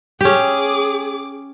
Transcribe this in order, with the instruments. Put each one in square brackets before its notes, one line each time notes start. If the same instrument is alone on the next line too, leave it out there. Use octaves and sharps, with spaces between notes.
[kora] C#4 G4 [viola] G#4 D6